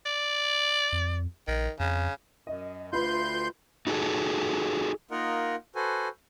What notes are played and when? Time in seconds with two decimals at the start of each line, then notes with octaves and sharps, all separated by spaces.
0.06 D5
0.92 F2
1.48 A#1 D#3
1.80 F2 C#3
2.47 F#2 D#5
2.93 D2 F4 B4 C6 G6
3.87 D#4 F#4 G#4 A4
5.11 A#3 D#4 F4 A#4 D#5 F#5
5.75 F#4 A4 B4 C5 G#5